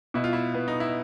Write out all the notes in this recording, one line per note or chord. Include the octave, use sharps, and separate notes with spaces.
B2 E4
F4
E4
B3
D#4
E4